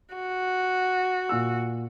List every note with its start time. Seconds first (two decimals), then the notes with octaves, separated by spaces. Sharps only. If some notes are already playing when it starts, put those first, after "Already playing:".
0.15 F#4
1.29 A#2 E6